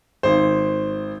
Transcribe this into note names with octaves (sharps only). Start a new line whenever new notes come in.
G#1 C5